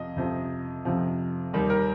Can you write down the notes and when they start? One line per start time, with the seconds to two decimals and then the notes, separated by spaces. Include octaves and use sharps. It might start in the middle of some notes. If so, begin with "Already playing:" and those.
Already playing: F2 C3 F3 D#5
0.16 F2 C3 F3
0.85 F2 C3 F3
1.53 D#2 D#3 G3
1.70 A#4